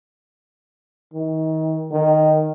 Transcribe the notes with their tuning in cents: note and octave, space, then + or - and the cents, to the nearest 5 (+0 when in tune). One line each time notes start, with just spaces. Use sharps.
D#3 +35
D#3 -5